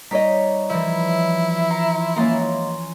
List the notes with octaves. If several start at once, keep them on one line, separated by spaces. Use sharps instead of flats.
G3 D#4 C#5 D#5 B6
E3 F3 E4
A#5 C6
G#3 A#3 C#4 A#5 C6 D#6 A6